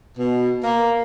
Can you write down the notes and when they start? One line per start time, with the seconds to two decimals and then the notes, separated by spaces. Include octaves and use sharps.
0.16 B2
0.63 A#3